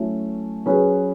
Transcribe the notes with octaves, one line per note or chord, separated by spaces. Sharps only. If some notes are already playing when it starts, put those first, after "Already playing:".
Already playing: F#3 A3 C#4 E4
F#3 C#4 G#4 B4